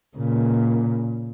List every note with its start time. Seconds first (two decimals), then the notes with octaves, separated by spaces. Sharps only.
0.17 A#2 C#3